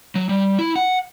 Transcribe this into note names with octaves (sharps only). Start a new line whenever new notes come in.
F#3
G3
E4
F#5